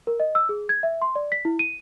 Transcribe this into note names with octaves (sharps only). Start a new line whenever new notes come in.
A#4
D#5
E6
G#4
G#6
E5
C6
D5
B6
E4
D#7